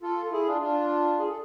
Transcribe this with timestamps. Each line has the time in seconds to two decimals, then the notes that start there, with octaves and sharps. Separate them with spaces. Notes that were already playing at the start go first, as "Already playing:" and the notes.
0.03 F4 A4
0.26 A4
0.31 E4 G#4
0.46 D4 F4
0.61 D4 F4
1.19 G#4
1.28 A4